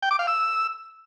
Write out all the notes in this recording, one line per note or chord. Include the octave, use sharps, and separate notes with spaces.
G5
D6
F5
E6